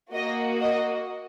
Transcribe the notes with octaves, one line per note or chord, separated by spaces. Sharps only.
A#3 F#4 D#5
D#5